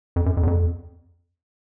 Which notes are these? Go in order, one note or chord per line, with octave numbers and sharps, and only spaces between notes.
F2
F#2
F2
E2
F2